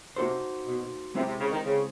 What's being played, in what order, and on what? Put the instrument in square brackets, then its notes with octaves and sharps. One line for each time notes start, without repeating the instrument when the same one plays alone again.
[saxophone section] C3 [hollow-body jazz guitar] A#3 D#4 F#4 A4 C5
[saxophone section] B2
[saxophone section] C3 [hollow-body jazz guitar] G#3 C4 E4 G4
[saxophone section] C3
C#3
D#3
C#3